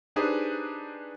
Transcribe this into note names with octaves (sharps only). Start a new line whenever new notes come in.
D4 D#4 G4 G#4 B4 C5